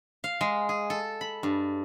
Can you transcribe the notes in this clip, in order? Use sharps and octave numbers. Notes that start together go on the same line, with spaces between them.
F5
G#3
G#4
A4
B5
G2